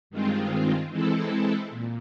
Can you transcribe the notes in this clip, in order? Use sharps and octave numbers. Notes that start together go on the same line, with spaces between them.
G2 D#3 G#3 C4 F4
E3 G#3 C4 E4 A4
A#2